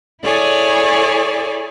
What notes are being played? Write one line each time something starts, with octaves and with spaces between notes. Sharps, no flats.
E4 G#4 A4 C#5 D5 G#5